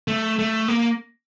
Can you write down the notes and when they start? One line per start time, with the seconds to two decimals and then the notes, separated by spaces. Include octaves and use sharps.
0.08 A3
0.39 A3
0.68 A#3